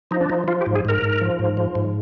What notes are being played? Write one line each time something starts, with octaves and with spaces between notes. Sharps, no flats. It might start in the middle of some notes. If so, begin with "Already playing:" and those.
F3 D#4
D4
F3 D#4
F3 F4
G4
G#2
G#4
G#2 A#4
G#2
F3
G#2
F3
G#2